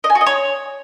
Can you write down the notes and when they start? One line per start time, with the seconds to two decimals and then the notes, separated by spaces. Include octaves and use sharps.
0.04 D#5
0.10 G#5
0.15 F#4
0.21 D#5
0.27 C#5